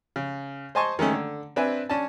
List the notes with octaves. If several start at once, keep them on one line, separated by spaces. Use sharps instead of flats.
C#3
C5 D#5 G#5 A5 C6 C#6
D#3 G#3 A3 C#4
D3
C4 D4 B4 E5 G#5
C#4 D4 A5